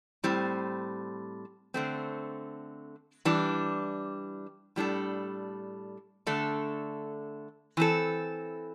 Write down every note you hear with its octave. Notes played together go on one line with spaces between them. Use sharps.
A2 G3 C4
D3 A3 C4
E3 G3 D4
A2 G3 D4 A4
D3 A3 D4 A4
E3 C4 A4